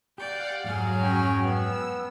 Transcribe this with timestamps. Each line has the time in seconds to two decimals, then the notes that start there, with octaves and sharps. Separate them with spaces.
0.18 G4 D5 F5 F#5 G6
0.64 F2 G#2 F#3 G#4 F6
1.03 C#4 G5
1.44 B3 E6